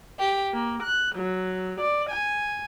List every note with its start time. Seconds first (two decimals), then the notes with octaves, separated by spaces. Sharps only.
0.18 G4
0.53 A#3
0.82 F#6
1.15 F#3
1.80 D5
2.10 G#5